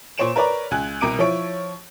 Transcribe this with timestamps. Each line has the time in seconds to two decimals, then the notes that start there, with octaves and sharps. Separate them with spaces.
0.18 A#2 C5 C#5 D7 E7
0.36 A#4 B4 C#5 D5 A#5
0.71 C#2 G#5 F#6
1.01 C2 B2 A#4 D6 D7 D#7
1.19 F3 E4 C#5 D7